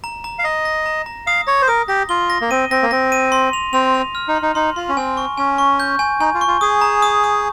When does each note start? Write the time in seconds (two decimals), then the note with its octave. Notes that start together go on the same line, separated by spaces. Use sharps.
0.04 A#5
0.24 A#5
0.39 F5
0.44 D#5 A#5
0.65 A#6
0.86 A#5
1.06 A#5
1.27 F5 D#6
1.47 C#5 A#6
1.62 C5
1.68 A#4 D#6
1.88 G4 A#6
2.09 F4 G7
2.30 A#6
2.41 A#3
2.51 C4 D#7
2.71 C4 A#6
2.83 A#3
2.91 C4 A#6
3.12 D#7
3.32 C6
3.53 F7
3.73 C4 F7
3.94 F7
4.15 F6
4.28 D#4
4.35 C6
4.42 D#4
4.55 D#4 C6
4.76 F4 C6
4.89 C#4
4.97 C4 G#5
5.17 C#6
5.37 C#4 G#5
5.58 C#6
5.80 G6
5.99 G#5
6.20 D#4 G#5
6.35 F4
6.41 C#6
6.48 F4
6.61 G#4 D#6
6.81 A#5
7.02 D#6
7.24 D#6